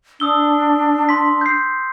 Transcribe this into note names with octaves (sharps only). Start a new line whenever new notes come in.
D4 D#6 E6 G7
C6 B6
G6 C7